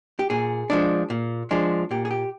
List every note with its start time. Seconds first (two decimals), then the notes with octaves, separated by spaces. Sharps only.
0.19 G4
0.30 A#2 G#4
0.70 F3 G#3 D4
1.10 A#2
1.51 F3 G#3 D4
1.91 A#2 G4
2.05 G#4
2.11 G4